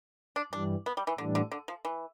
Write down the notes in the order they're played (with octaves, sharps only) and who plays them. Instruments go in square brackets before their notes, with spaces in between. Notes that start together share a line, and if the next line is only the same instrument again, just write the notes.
[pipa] D4
[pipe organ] G2 E3 G3 [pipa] D4
[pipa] B3
G3
E3
[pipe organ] A2 E3 G3 D4 [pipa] D3
[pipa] D3
D3
F3
E3